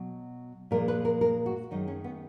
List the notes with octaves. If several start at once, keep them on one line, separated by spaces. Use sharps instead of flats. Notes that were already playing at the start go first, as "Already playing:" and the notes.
Already playing: B2 F#3
A#2 F3 G#3 A#4
B4
A#4
A#4
F#4
F#2 D#3 G#3 D#4
C#4
B3